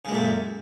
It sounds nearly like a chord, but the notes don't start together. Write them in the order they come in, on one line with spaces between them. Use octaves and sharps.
C#3 G#3 A#2 A3 F#2